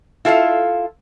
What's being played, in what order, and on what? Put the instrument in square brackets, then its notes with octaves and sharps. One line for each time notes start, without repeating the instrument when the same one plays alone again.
[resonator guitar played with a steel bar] E4 F4 A4 B4 F5